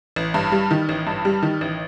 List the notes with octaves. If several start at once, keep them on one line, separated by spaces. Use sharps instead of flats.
A1
G2
G3
D#3
A1
G2
G3
D#3
A1